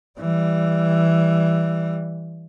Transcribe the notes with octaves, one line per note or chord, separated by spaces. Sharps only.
E3 G3